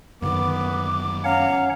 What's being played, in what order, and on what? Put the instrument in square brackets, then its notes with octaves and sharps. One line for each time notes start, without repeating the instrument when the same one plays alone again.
[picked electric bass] F#2 D3 D#3 [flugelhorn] B3 [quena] D6
[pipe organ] C#4 C#5 F#5 [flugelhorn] F5 [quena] A#5